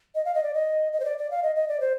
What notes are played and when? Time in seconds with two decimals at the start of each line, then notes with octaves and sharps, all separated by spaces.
0.15 D#5
0.25 F5
0.35 D#5
0.43 D5
0.54 D#5
0.93 D#5
1.00 C5
1.05 D5
1.18 D5
1.31 F5
1.43 D#5
1.56 D#5
1.69 D5
1.80 C5